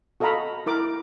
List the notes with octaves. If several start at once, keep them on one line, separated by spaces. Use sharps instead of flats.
F#4 A4 D#5 F5 A#5 B5
E4 A#4 D6